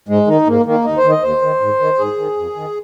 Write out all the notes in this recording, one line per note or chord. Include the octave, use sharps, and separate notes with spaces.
G#2 G#3
D#3 D#4
G#2 A#3
D#3 A#3
D#2 D#4
C5
D#3
D#5
D#2 C5
D#3
G#2
D#3
G#2 G#4
D#3
F2
D#3